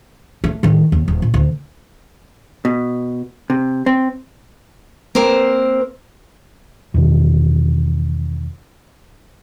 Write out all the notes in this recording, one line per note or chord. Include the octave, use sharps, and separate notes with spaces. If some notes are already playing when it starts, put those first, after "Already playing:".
A3
A2 D#3
D#2
D#1
A#2
D2
B2
C3
C4
A#3 C4 A#4 C5
E2 B2 D#3